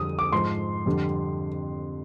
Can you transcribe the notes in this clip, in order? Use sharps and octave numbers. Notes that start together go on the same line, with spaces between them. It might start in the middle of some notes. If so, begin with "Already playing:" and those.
Already playing: F2 D3 G3 D#6
D6
G#2 F3 C6
F2 D3 G3